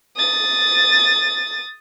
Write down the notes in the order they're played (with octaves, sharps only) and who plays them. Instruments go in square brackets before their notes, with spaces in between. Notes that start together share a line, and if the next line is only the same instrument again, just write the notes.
[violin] D#6 A6